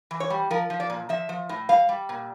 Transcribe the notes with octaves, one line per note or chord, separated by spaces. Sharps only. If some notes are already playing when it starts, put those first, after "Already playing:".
E3
C#5
G3
F3 A#4
F3
D5
A#2
F3 E5
F3
A2
G3 F5
G3
A#2